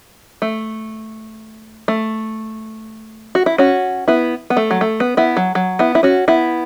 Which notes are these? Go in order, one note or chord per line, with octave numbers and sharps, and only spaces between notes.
A3
A3
F#4
E4
C#4 F#4
B3 E4
B3
A3
F#3
A3
B3
B3 E4
F#3
F#3
B3 E4
E4
C#4 F#4
B3 E4